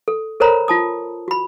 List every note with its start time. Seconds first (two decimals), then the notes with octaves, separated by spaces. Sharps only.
0.08 A4
0.40 A4 A#4 C5 C#5 A#5 B5
0.68 F4 A5 D#6
1.28 F#4 B5